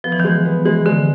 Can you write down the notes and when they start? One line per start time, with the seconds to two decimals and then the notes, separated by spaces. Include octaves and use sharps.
0.04 F3 B3
0.12 E3
0.20 D#3
0.25 E3 G#3
0.45 B3
0.65 E3 G#3
0.86 D3 G#3